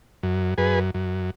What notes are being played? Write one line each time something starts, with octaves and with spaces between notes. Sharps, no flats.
F#2
F#2 G#4 B4
F#2